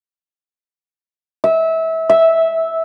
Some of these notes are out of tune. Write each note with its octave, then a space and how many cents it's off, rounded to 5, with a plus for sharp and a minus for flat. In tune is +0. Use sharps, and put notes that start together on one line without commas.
E5 -25
E5 -10